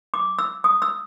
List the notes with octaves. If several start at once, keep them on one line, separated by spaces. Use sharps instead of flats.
D6
E6
D#6
E6